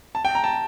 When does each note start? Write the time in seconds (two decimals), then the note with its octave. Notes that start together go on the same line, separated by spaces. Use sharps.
0.15 A5
0.25 G5
0.35 A#5
0.44 A5